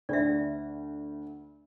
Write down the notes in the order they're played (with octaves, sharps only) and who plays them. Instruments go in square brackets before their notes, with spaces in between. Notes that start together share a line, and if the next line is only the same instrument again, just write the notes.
[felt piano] D2 [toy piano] D5 E5